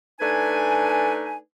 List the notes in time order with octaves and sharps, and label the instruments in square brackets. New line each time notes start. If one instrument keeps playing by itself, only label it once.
[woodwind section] A3 D4 D#4 B4 G#5